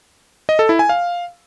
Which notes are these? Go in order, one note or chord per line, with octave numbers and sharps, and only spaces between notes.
D#5
A4
E4
G#5
F5